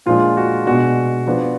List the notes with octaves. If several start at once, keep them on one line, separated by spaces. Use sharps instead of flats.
A#2 F3 G#3 D4 F4
F#4
B2 G#3 D4 F#4
F3 B3 D4